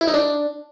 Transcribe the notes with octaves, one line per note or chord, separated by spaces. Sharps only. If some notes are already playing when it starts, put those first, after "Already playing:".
E4
D#4
D4